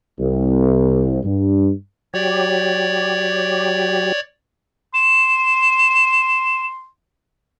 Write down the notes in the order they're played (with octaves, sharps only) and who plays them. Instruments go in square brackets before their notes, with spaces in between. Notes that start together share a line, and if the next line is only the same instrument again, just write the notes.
[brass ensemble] C2
G2
[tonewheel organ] F#3 G4 [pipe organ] C#5 D5
[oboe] C6 [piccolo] E7